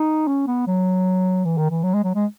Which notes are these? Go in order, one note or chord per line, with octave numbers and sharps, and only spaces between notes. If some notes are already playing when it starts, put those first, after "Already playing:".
Already playing: D#4
C#4
B3
F#3
E3
D#3
E3
F#3
G#3
F#3
G#3